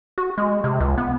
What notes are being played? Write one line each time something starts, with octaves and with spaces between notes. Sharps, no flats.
F#4
G#3
C3
C#2
B3